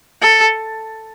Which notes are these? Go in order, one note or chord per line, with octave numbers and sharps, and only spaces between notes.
A4